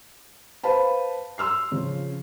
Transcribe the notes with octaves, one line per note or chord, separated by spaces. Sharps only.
B4 C5 F5 A5 B5
C6 E6 F6 C7
C#3 F3